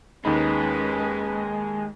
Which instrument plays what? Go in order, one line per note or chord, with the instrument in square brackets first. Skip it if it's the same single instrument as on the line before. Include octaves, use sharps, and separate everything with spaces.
[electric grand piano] D#2 D#4 B5 [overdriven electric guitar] G#3 [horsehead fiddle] C#4 B4